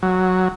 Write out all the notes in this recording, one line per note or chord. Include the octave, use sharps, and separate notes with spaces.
F#3